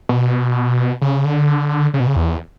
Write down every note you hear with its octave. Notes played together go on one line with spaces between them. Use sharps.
B2
C#3
D3
C#3
B2
C#3
E2